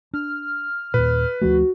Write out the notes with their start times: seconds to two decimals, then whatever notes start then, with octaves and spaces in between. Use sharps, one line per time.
0.13 D4 F6
0.94 D#2 A#2 B4
1.41 D2 F3 A3 F#4